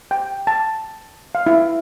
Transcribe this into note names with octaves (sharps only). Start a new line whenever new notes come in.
G5
A5
F5
E4